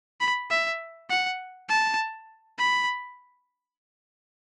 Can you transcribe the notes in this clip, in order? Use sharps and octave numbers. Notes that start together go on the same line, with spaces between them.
B5
E5
F#5
A5
B5